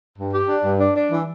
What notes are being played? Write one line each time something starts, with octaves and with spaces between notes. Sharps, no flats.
G2
G4
D4
G2
D4
D4
E3